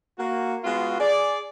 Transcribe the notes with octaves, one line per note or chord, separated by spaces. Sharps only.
A#3 F#4
G#3 B3 F4 F#4
G#4 D5